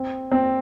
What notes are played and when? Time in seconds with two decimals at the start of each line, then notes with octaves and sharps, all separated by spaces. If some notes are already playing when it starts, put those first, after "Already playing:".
Already playing: C4
0.31 C4